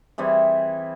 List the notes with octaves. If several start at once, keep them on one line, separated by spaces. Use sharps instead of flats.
E3 G3 C4 G#4